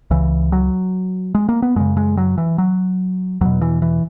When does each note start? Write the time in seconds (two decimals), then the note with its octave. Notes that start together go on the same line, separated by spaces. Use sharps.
0.11 C#2 C#3 E3
0.52 F#3
1.35 G#3
1.49 A#3
1.62 B3
1.76 F#2 C#3 G#3
1.97 G#3
2.17 F#3
2.38 E3
2.58 F#3
3.41 E2 B2 F#3
3.61 E3
3.82 E3